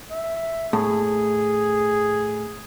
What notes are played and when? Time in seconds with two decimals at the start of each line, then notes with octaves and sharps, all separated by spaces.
0.11 E5
0.73 A2 G#4